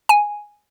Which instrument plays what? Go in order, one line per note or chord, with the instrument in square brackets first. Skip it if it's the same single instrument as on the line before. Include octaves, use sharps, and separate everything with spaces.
[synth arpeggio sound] G#5